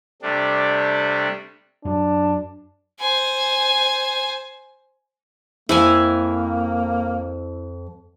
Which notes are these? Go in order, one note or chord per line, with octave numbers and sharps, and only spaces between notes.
C3 G3 A3 D4
F#2 D4
C5 G#5
F2 A#3 E4 F5 G#5